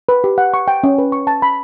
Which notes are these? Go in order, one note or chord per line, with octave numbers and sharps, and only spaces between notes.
B4
G4
F#5
C#6
G5
C#4
B4
C#6
A5
B5